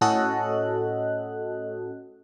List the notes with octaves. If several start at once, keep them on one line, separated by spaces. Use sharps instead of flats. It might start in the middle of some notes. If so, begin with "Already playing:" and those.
A2 C#4 F#4 A4 D#5 F#6